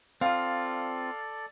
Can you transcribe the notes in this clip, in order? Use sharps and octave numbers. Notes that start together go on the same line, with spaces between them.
C4 F4 A4 D5 F5